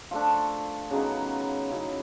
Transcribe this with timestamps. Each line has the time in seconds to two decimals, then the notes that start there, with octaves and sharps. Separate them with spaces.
0.11 F3 A3 D4 F4
0.90 C#3 F#3 B3 D#4
1.70 C#3 F#3 B3 D#4 E4